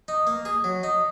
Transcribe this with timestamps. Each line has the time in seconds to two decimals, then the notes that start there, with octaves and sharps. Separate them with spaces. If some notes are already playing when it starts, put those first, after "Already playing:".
0.08 D#4
0.27 A#3
0.45 G#4
0.64 F#3
0.83 D#4